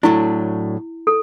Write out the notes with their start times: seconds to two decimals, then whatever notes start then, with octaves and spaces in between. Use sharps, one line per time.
0.03 A2 F#3 A3 D4 E4
1.07 A4